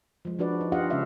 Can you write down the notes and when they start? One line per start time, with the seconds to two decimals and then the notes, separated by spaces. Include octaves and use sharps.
0.25 F3 G#3
0.39 F3 D4 F#4 B4 D5
0.61 D#4
0.72 D4 F4 G4 D#5 F5 F#5
0.90 C#3 G#3 C#4 E5 F5